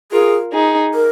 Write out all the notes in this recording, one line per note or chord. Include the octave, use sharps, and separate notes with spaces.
F4 G#4 A#4
D#4 G#4
A#4